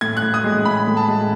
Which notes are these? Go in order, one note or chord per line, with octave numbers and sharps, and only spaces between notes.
A2 G#6
F#6
A2
D#6
G#3
A2 B5
A2
A5
G#3